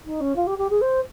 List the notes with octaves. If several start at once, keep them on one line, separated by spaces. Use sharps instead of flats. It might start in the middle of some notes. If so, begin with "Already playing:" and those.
D#4
C#4
F4
G4
G4
G#4
C5